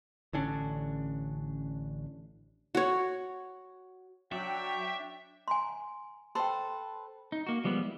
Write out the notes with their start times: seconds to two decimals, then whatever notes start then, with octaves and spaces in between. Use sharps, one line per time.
0.33 A1 D3 C#4 D4
2.75 F#4 C#5
4.32 F#3 D4 C#5 D5 E5 G5
5.48 G#5 A#5 C6
6.35 A4 B4 C5 G5 C6
7.32 D#4
7.47 A#3 F#4
7.64 F3 G3 G#3 B3
7.83 E4